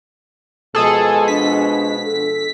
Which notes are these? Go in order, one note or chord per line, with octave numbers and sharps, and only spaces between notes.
B2 F3 G#3 G#4 A4
D4 B6
A4